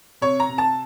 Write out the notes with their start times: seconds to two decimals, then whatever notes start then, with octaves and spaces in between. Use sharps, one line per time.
0.21 C3 C#5
0.40 A#5
0.49 C3
0.58 A5